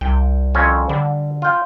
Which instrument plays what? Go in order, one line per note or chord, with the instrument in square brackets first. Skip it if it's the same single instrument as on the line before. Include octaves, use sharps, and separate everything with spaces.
[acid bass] C2 [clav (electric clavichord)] G5
[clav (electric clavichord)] F2 C4 C#4
[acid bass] D3 [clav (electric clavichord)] G3
[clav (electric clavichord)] F4 G5